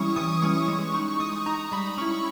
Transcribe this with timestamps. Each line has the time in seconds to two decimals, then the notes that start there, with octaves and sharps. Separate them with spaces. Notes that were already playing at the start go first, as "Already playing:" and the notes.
Already playing: E3 G3 C#4 E4 C#6 D#6
0.16 E3 D#6
0.42 G3 C#4 E4 C#6
0.68 G#3 C#6
0.94 D#4 C#6
1.20 G#3 D#6
1.46 D#4 A#5
1.72 G3 B5
1.97 C#4 E4 C#6